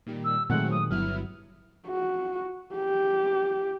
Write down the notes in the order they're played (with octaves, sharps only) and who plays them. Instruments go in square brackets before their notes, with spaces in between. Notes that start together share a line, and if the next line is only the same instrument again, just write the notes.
[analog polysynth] A#2 D#3 G3
[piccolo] E6
[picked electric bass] A#2 D#3 G#3 [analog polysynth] F#3 A3 C4 [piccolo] F#5
[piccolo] D#6
[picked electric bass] G1 [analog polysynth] F#3 B3 E4 [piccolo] F6
[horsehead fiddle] F#4
G4